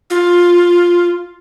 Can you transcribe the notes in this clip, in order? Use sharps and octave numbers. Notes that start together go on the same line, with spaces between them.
F4